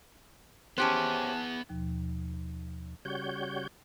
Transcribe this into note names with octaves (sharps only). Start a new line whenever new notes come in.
B3 C#4 G4 G#4 C5 A5 F#6
D#2 B2 F3
C#3 G3 F#4 C#5 G6